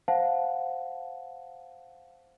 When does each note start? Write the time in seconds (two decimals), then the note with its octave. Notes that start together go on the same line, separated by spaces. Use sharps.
0.08 C5 F5 F#5 A5